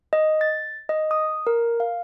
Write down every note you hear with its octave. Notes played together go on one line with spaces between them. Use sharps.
D#5
A6
D#5
D#6
A#4
F5